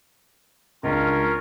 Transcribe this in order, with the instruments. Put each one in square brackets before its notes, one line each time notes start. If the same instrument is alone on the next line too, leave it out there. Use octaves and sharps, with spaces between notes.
[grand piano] C#2 D4 [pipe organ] C#4 F4 A#4